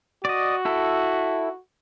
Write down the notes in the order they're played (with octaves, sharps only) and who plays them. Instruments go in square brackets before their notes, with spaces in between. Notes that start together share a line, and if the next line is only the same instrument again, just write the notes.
[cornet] F#4 [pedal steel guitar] D5 D#5
[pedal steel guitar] E4 A4